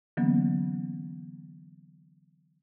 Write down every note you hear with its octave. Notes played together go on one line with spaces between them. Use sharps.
D3 E3 F#3 A#3 B3 C#4